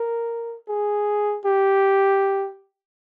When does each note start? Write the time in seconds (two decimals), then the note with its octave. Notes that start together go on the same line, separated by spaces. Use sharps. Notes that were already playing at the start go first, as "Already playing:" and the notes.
Already playing: A#4
0.69 G#4
1.45 G4